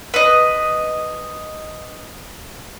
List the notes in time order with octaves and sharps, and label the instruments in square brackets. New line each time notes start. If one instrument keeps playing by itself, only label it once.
[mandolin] B4 D#5